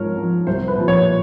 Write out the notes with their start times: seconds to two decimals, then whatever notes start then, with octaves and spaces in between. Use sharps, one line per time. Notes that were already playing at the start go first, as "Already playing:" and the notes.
Already playing: G#2 F3 A#4 C#5
0.16 F3
0.47 C2 C5
0.68 B4
0.78 A#2 F3
0.88 C#5